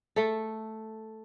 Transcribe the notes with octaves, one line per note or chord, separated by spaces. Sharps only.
A3 A4